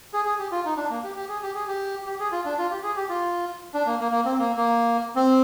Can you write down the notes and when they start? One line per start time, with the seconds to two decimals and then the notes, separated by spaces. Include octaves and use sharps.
0.13 G#4
0.25 G#4
0.39 G4
0.52 F4
0.65 D#4
0.77 D4
0.90 A#3
1.04 G4
1.16 G4
1.29 G#4
1.42 G4
1.55 G#4
1.68 G4
2.06 G4
2.20 G#4
2.32 F4
2.45 D4
2.58 F4
2.71 G4
2.83 G#4
2.96 G4
3.09 F4
3.74 D4
3.86 A#3
4.00 A#3
4.12 A#3
4.25 C4
4.38 A#3
4.57 A#3
5.16 C4